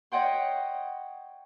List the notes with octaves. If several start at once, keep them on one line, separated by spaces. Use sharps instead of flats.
C#5 D#5 F#5 G5 C6